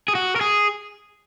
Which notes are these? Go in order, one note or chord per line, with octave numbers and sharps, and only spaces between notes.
G#4
F#4
A#4
G#4